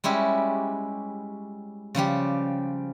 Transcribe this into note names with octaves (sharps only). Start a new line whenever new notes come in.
G3 G#3 C#4 E4 F#4 G4
C#3 F3 G3 G4